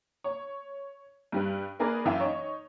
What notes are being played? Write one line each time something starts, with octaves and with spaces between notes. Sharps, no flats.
C#5
G2 G3 B4
A#3 G#4 A#4 B4 D5
F#2 E3 E5 F5 G5 G#5
D#4 C#5